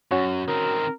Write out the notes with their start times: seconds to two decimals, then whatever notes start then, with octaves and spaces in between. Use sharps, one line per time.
0.11 F#2 C#4 F#4 C#5
0.48 D#3 C4 A#4